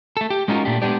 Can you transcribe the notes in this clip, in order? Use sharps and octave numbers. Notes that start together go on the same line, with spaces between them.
A3 A4
G4
G#3 C#4 D#4 F4 F#4 A#4
A#2 A3 D4 G4
G#3 A3 B3 D4 G4 D5